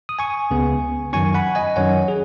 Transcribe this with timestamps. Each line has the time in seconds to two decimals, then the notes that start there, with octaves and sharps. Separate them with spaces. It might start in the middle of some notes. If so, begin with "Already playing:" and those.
0.09 D#6
0.19 G#5 C#6
0.51 C#2 C#3 B3
1.13 F#2 D#3 F#3 C#4 G#5 C#6
1.34 F#5 B5
1.55 D#5 G#5
1.76 F#2 D#3 F#3 C#4 C#5 F#5
2.08 G#4